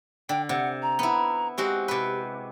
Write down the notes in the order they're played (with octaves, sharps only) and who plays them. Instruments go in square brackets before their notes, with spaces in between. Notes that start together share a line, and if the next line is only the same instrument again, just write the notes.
[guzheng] D3 [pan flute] G5
[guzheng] C3 [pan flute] F#5
[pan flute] A#5
[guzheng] B3 E4
[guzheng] G#3 C4 F#4 [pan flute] G4
[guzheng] C3 B4